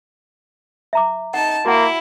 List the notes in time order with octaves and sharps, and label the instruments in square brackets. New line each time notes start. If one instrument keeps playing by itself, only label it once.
[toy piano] E5 A#5 D6
[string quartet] D#4 A5 [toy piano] F#5
[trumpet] A#3 [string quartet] E4 [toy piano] F#4 F#5